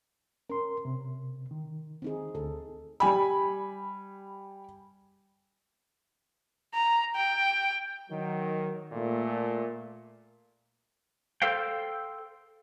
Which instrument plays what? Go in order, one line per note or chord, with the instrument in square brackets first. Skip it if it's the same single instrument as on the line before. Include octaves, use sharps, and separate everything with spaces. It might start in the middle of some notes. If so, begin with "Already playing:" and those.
[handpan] C#4 [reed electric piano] A#4 C6
[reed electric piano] C3
D#3
[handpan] C4 D#4 G#4
[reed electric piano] D2 [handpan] A4
[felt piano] G3 G#5 B5
[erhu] A#5
G5
[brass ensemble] D#3 F#3
A#2 A3
[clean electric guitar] A4 C5 F5 G5